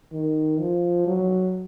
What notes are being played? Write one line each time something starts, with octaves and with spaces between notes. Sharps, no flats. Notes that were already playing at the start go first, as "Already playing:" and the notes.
D#3
F3
F#3